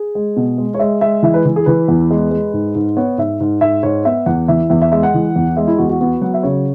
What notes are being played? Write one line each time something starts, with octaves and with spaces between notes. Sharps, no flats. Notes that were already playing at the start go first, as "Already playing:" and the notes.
Already playing: G#4
G#3
B2
G#3
C#5
G#3 E5
G#3 E5
E3 E5
B4
E3
G#4
E3 B4
E2
G#3
G#3
G#2
G#2
B3 C#5
G#2 E5
G#2
G#2 E5
G#2 C#5
B3 E5
E2 F#5
E3 E5
E2 E5
E5
G#3 E5
F#5
E3
E2
G#3 E5
E4
E2 F#4
F#4
B3 F#4
F#3 F#5
E5
C#3 C#5